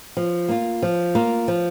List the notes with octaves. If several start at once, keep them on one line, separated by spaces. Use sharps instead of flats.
F3
A#3 F4
F3
A#3 F4
F3